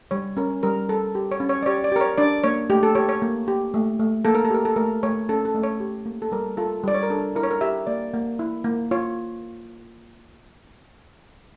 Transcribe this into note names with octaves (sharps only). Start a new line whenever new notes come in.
G3 C#5
C#4 A#4
G3 A#4
G3 A4
G4
C#5
C#4
C#5
D5
G4 C#5
D5
G4 A#4
C#5
D4 D5
A#3 C#5
A3 G4
A4
G4 C#5
C#5
A#3
G4
A3
A3
A#3 A4
A#4
A4
G4 A#4
A4
A3 A#4
A3 C#5
C#4 A4
A4
A3
C#5
G4
A#3
A4
G3 A#4
F4 A4
G3 D5
C#5
A#4
D4 A4
E4 A#4
C#5
A#4
G4 E5
A#3 D5
A#3
E4
A#3
F4 C#5